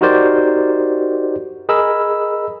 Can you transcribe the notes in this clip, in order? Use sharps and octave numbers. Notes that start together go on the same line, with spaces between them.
D#4 F#4 G4 A#4 C5 D5
G#4 A#4 D#5 B5 E6